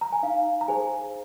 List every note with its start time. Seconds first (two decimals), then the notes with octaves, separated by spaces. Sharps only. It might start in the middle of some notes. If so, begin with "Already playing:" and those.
0.01 A#5
0.12 G#5
0.23 D#4 F5
0.61 A#5
0.68 G#4 C5 G#5